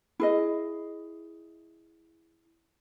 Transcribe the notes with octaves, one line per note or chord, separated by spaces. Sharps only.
E4 G#4 D#5